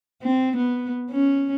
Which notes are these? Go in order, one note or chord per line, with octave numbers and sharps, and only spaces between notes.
C4
B3
C#4